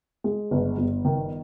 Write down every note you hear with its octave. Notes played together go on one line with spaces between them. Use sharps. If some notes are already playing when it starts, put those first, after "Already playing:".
G#3
G1
G1
D#3